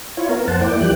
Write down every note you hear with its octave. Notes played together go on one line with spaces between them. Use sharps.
E4 F4 C#5
B3 A#4
F2 C5 F#5 A5
A#3 E4 D5 G5
E2 E3 F3 G3 G5 F#6